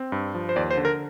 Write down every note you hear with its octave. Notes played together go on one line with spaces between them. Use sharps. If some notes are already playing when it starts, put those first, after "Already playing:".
Already playing: C4
G2
F3
C5
D#2 D5
C5
D3
A#4